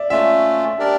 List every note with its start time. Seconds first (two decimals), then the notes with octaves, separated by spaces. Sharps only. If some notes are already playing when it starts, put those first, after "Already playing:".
Already playing: D5 E5
0.10 A3 C#4 F4 E5
0.78 D4 G4 A#4 D5